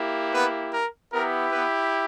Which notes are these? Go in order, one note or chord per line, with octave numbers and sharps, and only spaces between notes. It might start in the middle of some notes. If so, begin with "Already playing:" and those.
Already playing: A#3 E4 G4
B3 B4
A#4
B3 E4 G4 A#4
B3 B4